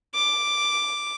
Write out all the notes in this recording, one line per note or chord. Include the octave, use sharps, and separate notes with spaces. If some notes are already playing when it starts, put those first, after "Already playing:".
D6